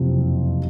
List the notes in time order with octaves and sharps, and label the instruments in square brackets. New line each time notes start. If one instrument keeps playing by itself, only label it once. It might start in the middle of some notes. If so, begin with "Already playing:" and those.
Already playing: [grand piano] F#1 F2 C3